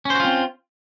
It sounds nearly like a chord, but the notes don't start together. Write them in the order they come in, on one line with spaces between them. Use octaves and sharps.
C#4 C5 F#4 F4 C4